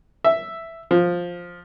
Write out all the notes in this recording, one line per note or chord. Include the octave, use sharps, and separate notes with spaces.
E5
F3